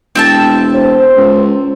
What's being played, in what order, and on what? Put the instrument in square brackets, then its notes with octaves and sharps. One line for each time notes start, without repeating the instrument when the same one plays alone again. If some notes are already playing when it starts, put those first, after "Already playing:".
[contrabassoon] E1 [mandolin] C4 E5 A5
[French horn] C5
[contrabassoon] C#2